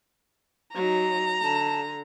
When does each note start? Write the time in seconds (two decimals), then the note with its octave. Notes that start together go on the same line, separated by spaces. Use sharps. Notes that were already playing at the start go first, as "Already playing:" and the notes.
0.75 F#3 D#4 A#5
1.43 D3 A5